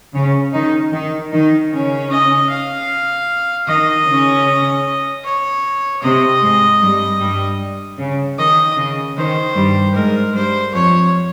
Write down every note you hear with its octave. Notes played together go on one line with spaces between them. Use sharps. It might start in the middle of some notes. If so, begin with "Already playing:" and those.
C#3 C#4
D#3 D#4
D#3 D#4
D#3 D#4
C#3 C#4
D#5
F5
D#3 D#4 D#5
C#3 C#4
C#5
C3 C4 D#5
G#2 G#3
G2 G3
G2 G3
C#3
D#3 D#5
C#3
D#3 C5
G2 G3
G#2 G#3 A#4
G2 G3 C5
F2 F3 C#5